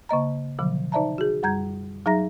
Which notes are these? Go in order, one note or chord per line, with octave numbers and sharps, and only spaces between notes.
C#3 A#3 D#5 A#5
B2 D3 F3 F#3
D#4 C5 D5 E5 A5 A#5
F#4 G#4
F#2 G3 A#5 G6 G#6
F#3 D#4 G#4 E5 A#5 A#6